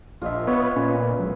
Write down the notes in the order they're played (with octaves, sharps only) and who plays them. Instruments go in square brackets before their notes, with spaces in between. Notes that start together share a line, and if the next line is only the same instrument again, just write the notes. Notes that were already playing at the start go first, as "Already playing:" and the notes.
[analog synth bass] E1 [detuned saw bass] A#1 [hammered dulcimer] F4 D#5 E5
[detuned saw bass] B3 [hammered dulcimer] C#5
[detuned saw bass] A#2 [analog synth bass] C#4 [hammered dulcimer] B4 C6
[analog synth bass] F#1
[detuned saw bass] E1 [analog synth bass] F#3